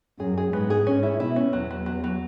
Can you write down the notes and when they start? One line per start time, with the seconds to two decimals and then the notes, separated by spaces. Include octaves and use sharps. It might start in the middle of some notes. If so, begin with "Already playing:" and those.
0.20 F#2 G#4
0.38 G#4
0.53 G#2 B3
0.70 G#4
0.87 G#2 C#4
1.03 E4
1.20 B2 E4
1.36 C#4
1.53 E2 F#3
1.71 F#3
1.86 F#3
2.04 F#3